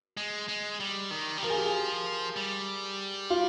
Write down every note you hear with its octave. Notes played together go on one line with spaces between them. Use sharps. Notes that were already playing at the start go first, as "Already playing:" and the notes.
G#3
G#3
G3
D#3
G3
F3 A#4
G#4
G4
G#4
G3
F4